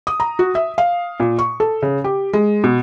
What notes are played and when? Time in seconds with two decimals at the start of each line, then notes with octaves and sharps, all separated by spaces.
0.07 D#6
0.20 A#5
0.39 F#4
0.55 E5
0.78 F5
1.20 A#2
1.39 C#6
1.60 A4
1.82 C#3
2.04 G4
2.33 G#3
2.64 B2